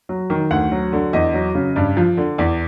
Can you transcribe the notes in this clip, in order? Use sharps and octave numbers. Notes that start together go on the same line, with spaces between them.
F#3
D#3
D2 F#5
F#3
D3
E2 D#5
F#3
C#3
G2 D5
F3
D3
E2 D5